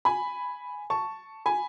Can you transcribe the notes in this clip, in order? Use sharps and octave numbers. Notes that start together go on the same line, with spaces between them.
G#5 B5
A5 C#6
G#5 B5